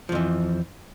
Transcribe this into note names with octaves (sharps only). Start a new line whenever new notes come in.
F2 E3 F3